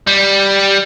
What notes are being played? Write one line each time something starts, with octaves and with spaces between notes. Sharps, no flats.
G3